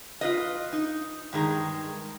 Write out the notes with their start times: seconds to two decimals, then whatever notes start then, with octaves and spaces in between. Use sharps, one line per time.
0.21 F4 B4 D#5
0.73 D#4
1.33 G2 D#3 G#3 A#5